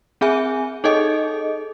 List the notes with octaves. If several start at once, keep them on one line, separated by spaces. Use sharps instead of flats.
C4 G#4 E5 G#5
D#4 G#4 A4 D#5